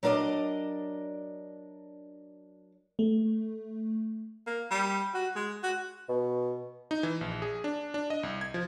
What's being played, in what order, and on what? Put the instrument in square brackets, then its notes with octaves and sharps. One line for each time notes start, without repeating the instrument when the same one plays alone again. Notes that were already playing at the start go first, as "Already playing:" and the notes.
[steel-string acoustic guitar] F#3 D4 A#4 D5 D#5
[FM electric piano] A3
[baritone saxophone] A#3
G3
F#4
G#3
F#4
[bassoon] B2
[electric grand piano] D#4
E3
A#1
G#4
D4
D4
D#5
C2
G#6
F3